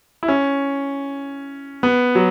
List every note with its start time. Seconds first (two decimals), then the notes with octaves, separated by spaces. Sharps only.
0.23 E4
0.28 C#4
1.83 B3
2.15 F#3